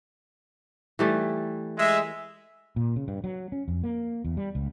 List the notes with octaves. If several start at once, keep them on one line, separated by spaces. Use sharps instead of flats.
E3 G3 A3
G#3 E5
A#2
C#3
G2
F#3
C#4
F2
A#3
E2
G3
C#2